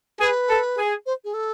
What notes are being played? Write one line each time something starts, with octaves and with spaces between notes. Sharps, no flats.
G#4 B4
A4
G#4
C5
G#4
A4